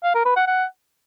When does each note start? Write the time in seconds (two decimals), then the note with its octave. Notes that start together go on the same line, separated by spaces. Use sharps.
0.04 F5
0.15 A#4
0.25 B4
0.36 F#5
0.47 F#5